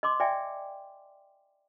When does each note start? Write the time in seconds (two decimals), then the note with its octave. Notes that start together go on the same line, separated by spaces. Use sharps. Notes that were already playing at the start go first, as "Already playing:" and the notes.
0.03 D#5 C6 D6
0.20 D5 E5 G5 G#5